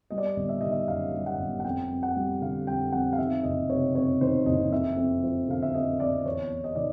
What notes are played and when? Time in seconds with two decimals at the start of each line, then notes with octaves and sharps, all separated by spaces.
0.11 G3 D#5
0.18 D5
0.26 D#5
0.36 G1
0.49 E5
0.61 D#3 D#5
0.72 E5
0.87 F#2 F5
1.14 G3
1.26 F#5
1.39 G1
1.60 F#5
1.64 F2 G5
1.90 F2
2.03 F#5
2.16 G3
2.41 D3 F5
2.67 F2 G5
2.92 F2 F#5
3.13 F5
3.18 D#3 E5
3.43 F#1 D#5
3.69 C3 C#5
3.95 F2 C#5
4.21 D#3 C5
4.46 F#1 D#5
4.72 F2 E5
4.97 F2
5.23 F3
5.48 D3 F5
5.63 E5
5.74 F2 D#5
5.99 F2 D5
6.25 E2 C#5
6.51 E2
6.64 D#5
6.75 D#3 D5